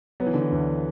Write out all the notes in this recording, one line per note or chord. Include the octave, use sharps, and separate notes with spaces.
F#3 B3
E3
D3
E3
D2